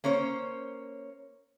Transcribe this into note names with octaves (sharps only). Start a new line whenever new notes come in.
A#3 C#4 C5 C#5